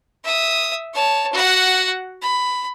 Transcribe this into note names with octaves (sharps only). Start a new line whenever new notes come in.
E5 D#6
C#5 A5
F#4 F#5
B5